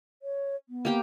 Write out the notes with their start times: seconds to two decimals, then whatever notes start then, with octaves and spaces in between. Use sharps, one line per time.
0.22 C#5
0.69 B3
0.85 A#3 G4 G5